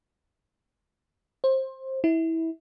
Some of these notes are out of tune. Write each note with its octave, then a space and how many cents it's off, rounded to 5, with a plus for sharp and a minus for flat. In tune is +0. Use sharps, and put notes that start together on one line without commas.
C5 +20
E4 -20